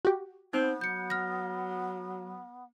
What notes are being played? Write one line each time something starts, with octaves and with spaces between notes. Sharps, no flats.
F#4 G4
B3 C4 D#4 C5 G6
F#3 G6 C#7
F6 A#6